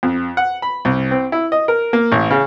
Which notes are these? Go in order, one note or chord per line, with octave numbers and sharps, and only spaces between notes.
F2
F#5
B5
C2
C4
E4
D#5
A#4
A#3
A1
C#3